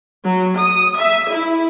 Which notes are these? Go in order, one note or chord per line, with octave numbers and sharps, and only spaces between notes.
F#3
D#6
E5
E4